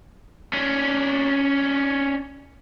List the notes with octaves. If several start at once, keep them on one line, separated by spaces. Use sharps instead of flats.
C#4 D4